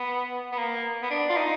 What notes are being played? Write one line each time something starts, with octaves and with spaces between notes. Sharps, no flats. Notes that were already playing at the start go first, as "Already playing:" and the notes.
Already playing: B3
B3
A#3
B3
D4
F4
D#4